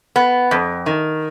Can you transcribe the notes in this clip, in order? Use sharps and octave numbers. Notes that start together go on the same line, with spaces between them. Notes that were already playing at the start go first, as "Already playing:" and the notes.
B3
F2
D#3